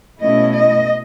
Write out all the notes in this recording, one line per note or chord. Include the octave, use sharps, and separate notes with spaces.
B2 A3 C#4 E4 D#5
D#5